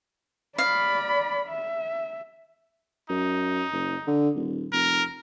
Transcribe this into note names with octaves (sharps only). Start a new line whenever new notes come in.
D5 F5 B5
E5
F#2 D#4
F#1
D3
D#1
F1 A#4